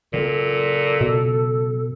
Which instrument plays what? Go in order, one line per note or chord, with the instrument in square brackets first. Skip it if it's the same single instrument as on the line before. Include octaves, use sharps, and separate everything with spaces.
[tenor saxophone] A#2 [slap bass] C#3 F#3 C4 [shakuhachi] A4
[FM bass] B2